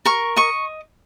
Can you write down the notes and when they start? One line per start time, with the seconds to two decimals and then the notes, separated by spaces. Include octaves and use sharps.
0.05 A#4 C#6
0.36 D#5 C#6